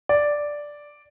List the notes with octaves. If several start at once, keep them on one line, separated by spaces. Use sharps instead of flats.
D5